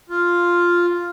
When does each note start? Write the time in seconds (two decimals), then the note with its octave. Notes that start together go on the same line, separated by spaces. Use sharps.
0.10 F4